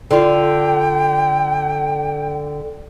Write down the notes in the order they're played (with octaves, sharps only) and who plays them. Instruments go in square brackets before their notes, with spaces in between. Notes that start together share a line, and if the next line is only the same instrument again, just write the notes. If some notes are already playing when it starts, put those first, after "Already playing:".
[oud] D3 F4 [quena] G5